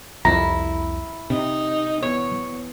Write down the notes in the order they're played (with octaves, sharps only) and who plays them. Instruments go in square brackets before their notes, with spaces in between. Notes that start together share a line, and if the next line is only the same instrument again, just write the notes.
[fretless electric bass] C2 F2 [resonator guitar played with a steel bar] E4 [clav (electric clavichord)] A#5
[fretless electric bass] C3 [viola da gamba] D#4
[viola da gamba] E2 [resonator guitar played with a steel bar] C#5